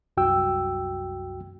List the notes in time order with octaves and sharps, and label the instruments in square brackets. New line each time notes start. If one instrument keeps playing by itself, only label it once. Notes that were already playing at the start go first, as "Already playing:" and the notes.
[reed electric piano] C2 F#2 F#4 G5 E6